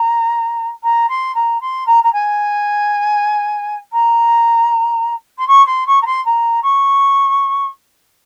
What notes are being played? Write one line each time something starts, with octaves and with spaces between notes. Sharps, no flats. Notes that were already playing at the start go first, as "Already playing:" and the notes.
Already playing: A#5
A#5
C6
A#5
C6
A#5
A#5
G#5
A#5
C6
C#6
C6
C#6
A#5
C6
A#5
C#6